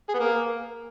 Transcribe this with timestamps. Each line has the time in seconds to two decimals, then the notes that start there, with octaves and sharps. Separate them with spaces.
0.09 G#4
0.14 B3
0.19 A#3